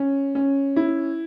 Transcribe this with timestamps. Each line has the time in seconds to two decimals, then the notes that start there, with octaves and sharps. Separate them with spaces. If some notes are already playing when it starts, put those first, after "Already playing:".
Already playing: C#4
0.35 C#4
0.76 E4